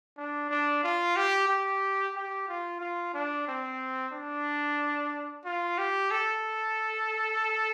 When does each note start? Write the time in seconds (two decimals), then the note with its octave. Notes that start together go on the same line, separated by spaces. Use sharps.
0.17 D4
0.50 D4
0.83 F4
1.16 G4
1.48 G4
2.15 G4
2.48 F4
2.81 F4
3.14 D4
3.47 C4
4.12 D4
5.45 F4
5.78 G4
6.11 A4